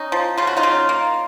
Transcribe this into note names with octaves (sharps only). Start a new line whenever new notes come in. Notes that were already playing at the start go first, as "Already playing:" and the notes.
Already playing: C#4 D#4
F3
C#3 F4
F#4
D#4 F4
C#3
A#3